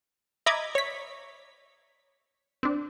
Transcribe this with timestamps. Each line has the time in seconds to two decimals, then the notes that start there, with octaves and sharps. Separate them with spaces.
0.46 D#5 E5 A#5 B5 D6 G#6
0.75 C#5 B6
2.63 C4 D4